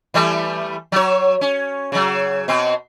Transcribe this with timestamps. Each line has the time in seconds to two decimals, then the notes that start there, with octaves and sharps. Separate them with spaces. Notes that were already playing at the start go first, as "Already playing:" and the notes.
0.14 E3 G3 A3
0.92 F#3 C#5
1.41 C#4
1.92 C#3 F#3
2.48 B2 C4